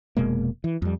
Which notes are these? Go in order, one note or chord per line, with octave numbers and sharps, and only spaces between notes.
F1 B2 G#3 A#3
E3
F2 G3